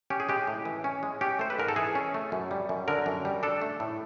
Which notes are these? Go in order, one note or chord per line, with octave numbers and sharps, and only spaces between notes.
C#4 G4
G#4
G#3 G4
A2
E3
C#4
G#3
C#4 G4
A3 C5
B4
G#2 A#4
A4
E3 G#4
C#4
A3
F#2
G3
F#2
D3 A#4
F#2
G3
D4 A4
A3
A2